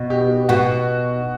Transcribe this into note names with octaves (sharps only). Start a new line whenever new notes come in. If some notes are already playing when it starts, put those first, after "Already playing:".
Already playing: B2
G4
B2 F#4